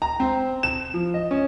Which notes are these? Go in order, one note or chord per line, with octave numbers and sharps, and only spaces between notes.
A#5
C4
E7
F3
D#5
C#4